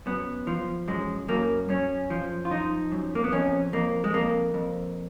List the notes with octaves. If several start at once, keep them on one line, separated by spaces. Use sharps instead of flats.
F#2 B3
F3
F#2 G#3
F#2 A#3
F#2 C#4
F3
F4
F3 D#4
F#2
A#3
B3
F2 C#4
F2 A#3
G#3
F2 A#3
F2